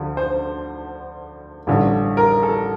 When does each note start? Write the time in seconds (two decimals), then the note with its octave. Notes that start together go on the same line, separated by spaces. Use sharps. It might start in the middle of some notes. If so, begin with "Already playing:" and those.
Already playing: D2 D3 F3
0.17 C5
1.67 A1 G2 D3 F3
2.17 A#4
2.43 A4